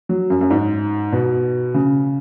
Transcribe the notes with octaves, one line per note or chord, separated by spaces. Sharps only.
F#3
F#2
F#2
G#2
B2
C#3